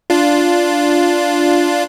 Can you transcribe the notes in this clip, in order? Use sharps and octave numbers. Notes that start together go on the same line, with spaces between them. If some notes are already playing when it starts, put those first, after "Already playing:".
D4 F4